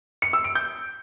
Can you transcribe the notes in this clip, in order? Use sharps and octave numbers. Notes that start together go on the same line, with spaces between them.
C#7
E6
D7
G6